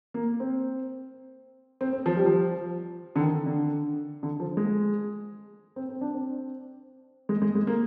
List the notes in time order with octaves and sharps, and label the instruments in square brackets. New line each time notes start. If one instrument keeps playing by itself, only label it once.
[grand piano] A#3
C4
C4
C4
F3
G3
F3
D3
D#3
D3
D3
F3
G#3
C4
C4
D4
C4
G#3
G#3
G#3
A#3